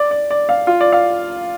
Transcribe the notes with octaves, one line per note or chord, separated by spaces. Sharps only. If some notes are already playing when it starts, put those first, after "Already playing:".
Already playing: D5
D5
D5
F5
F4
D5
F5